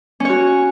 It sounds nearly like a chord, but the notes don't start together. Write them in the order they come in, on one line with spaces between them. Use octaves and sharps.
C#4 C#5 F#4